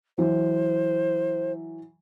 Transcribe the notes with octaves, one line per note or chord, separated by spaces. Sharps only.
E3 F#3 C5